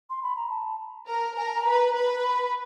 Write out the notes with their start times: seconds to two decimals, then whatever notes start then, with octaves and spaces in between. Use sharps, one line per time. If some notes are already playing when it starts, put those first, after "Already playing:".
0.10 C6
0.23 B5
0.36 A#5
0.50 A5
1.08 A#4
1.36 A#4 G#5
1.46 A5
1.56 A#5
1.66 B4
1.95 B4
2.23 B5